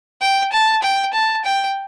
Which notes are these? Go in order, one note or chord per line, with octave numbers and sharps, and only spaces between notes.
G5
A5
G5
A5
G5